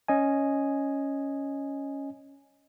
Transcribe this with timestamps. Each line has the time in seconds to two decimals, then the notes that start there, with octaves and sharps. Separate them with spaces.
0.08 C#4 D#5 G#5